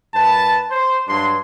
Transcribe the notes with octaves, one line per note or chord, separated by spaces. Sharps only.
F#2 B4 A5
C5
G2 F#3 D4 C6